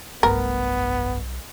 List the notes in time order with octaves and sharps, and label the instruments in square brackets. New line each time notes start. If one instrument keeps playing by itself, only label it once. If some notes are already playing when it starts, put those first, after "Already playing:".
[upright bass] F1 G2 [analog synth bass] B1 [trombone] B3 [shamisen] A#4